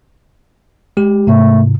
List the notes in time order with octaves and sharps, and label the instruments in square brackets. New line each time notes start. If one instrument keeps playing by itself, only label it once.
[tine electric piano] G#3 G4
[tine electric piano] G#2 C3 [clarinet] A3